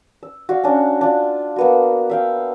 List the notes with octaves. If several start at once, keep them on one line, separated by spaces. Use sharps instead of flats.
E6
F#4 D5 F5
C#4 D4
D4 F4
A#3 B3 F#4
E5 F5 G5